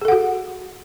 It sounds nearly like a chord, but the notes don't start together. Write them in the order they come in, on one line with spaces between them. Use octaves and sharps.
G#4 A4 F#5 F#4